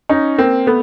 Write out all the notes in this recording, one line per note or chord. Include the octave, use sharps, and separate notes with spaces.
C#4 D#4
A#3 C4
A3 B3